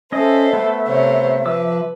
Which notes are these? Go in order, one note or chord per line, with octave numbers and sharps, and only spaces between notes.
C#4 A4 C5 D#5 E5
A3 B3
C3 C5 C#5
F3 B4 D6 E6